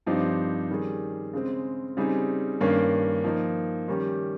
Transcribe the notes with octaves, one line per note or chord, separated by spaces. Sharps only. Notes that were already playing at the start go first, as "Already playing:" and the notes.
G2 F3 C4 D#4 G4
D#3 G3 C#4 G#4
C#3 G#3 C4
C#3 G3 C4 D#4 G#4
G2 D#3 A#3 C#4
F3 A#3 D#4
D#3 G3 C#4 G4